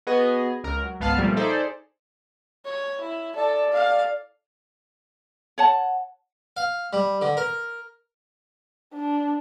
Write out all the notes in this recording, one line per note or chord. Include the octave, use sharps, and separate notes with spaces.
B3 F#4 G#4 B4 D#5
C#2 A#4
F#3
G#1 C#2 B3 F5 A5 F6
A#2 F3 G3 A3 A#3 C4
D#4 G#4 A4 C5 D5 E5
C#5
E4
A4 D5
F5
C#5 F#5 A5
F5
G3
D3
A#4
D4